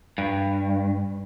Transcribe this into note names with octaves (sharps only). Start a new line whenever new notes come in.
G2